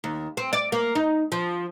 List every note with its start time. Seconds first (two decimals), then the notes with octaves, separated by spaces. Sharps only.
0.04 D#2
0.37 C4
0.53 D5
0.72 A#3
0.95 D#4
1.32 F3